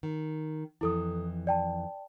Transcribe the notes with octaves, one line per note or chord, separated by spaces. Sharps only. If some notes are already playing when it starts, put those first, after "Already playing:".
D#3
F2 E3 E4 A4 D#6
D5 G5 A5